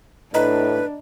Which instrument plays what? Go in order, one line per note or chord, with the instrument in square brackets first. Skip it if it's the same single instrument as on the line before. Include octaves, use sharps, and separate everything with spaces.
[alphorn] A2 [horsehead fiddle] D4 [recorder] B4 [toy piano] D#5 A#5 B5